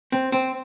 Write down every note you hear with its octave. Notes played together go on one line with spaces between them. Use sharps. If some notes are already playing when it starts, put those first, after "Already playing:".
C4
C4